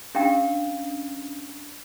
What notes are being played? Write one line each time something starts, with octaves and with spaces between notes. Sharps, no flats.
C#4 D4 G4 F5 G5